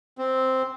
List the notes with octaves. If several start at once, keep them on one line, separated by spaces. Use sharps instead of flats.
C4